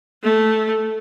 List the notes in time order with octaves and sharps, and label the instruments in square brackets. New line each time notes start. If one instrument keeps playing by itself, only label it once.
[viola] A3